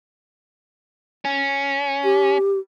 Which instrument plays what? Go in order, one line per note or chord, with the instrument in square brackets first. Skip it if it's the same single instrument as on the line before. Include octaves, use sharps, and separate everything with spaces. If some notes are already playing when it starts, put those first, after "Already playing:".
[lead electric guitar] C#4
[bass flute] G4